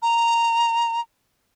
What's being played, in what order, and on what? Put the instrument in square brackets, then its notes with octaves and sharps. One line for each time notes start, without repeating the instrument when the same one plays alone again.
[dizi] A#5